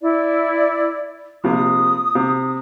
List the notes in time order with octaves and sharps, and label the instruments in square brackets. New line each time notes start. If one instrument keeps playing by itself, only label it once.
[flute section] E4 D5
[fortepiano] A#1 C3 [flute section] D#6
[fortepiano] C3